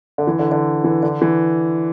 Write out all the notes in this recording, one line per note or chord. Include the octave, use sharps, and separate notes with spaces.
D3
E3
D3
D3
E3
D3
E3